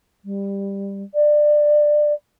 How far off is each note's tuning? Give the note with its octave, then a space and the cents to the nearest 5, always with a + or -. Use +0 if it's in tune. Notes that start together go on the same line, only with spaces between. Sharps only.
G3 +15
D5 +20